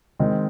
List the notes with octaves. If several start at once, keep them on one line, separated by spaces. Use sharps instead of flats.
D#3 G#3 C4